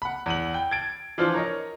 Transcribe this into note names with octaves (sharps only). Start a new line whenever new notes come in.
F#5 B5
E2 D#7 F#7
G5
G#6 A6 D7
E3 F3 D4 F4 C5
A#4 C#5 D#5